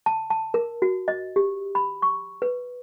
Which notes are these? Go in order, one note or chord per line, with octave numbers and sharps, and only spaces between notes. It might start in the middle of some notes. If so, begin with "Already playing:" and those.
A5
A5
A#4
F#4
D#5
G4
B5
C#6
B4